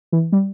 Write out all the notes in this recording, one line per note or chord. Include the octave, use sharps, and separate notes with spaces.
E3
G3